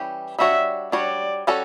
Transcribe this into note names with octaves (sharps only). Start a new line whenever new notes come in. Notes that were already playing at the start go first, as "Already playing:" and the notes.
Already playing: E3 G3 C#4 G4
G3 D4 F#4 C#5 E5
G3 D4 F#4 C#5 D5
G3 C#4 F#4 A4